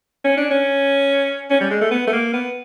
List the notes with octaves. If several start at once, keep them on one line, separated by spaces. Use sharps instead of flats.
C#4
D4
C#4
C#4
G3
G#3
A3
B3
A3
A#3
B3